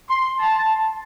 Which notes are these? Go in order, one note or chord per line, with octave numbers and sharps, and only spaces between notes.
C6
A5